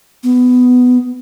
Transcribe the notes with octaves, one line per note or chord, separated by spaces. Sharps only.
B3